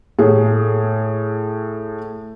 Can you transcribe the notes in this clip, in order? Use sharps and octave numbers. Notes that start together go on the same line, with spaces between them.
A2 G#4